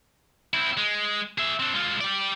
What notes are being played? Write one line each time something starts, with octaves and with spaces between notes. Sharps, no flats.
C4 E4
G#3
G#4 E5
C4 D4
G#3 F4
G4 D5